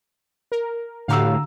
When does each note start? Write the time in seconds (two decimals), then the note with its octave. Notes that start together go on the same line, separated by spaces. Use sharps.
0.52 A#4
1.08 A2 D3 F#4 G4 F5 A#5 E6